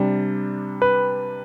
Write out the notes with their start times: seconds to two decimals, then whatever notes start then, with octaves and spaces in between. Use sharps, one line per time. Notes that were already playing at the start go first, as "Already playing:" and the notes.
Already playing: C3 G3 D4
0.82 B4